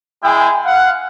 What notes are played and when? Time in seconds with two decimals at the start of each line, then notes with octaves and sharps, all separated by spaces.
0.24 G#3 E4 G#4 G5
0.65 F5 F#5